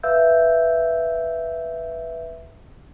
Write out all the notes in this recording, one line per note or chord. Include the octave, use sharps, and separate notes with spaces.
B4 E5 F5 E6 G6